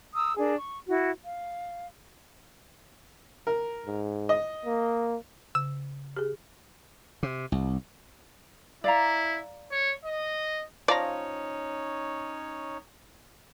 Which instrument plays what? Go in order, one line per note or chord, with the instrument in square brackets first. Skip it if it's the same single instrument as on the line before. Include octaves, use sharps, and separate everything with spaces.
[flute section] A#5 D#6 E6
D4 G#4 A#4
C#6
E4 F#4
F5
[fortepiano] A#4
[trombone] G#2
[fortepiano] D#5
[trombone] A#3
[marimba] C#3 [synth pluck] E6
[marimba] G4 G#4
[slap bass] C3
C2
[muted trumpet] E4 [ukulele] D5 F5 A#5
[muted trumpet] C#5
D#5
[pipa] F3 F5 A#5 [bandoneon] C#4 D#4 C#5 [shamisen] D5